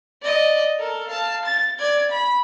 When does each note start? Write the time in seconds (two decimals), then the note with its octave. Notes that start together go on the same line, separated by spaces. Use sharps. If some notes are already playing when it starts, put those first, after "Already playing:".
0.22 D5 D#5
0.78 A4 A#4
1.08 F5 A5
1.45 A6
1.79 D5 G#6
2.11 B5